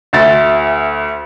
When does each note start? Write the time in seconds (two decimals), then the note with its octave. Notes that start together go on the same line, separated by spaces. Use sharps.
0.13 D2 E5 A6